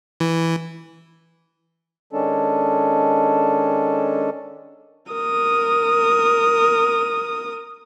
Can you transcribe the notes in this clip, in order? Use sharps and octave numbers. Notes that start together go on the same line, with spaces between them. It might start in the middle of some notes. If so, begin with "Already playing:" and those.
E3
D#3 G#3 C#4 D4 A4
A#4 D#6